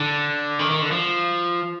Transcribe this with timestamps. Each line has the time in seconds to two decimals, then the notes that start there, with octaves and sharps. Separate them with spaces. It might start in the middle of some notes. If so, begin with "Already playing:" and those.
Already playing: D3
0.59 D#3
0.70 D#3
0.82 D3
0.91 F3